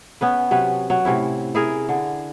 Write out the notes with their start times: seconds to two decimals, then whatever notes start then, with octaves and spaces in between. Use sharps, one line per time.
0.21 B3 C#4 B4
0.51 C3 F#3 C#4 B4
0.90 F#3
1.05 A2 C3 C#4 E4
1.55 E4 G#4 A#4
1.89 D3